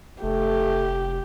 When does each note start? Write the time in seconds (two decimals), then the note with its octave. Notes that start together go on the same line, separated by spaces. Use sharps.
0.23 F1 A3 G4